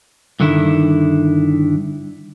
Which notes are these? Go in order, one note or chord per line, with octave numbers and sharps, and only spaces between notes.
G2 D3 D#3 E4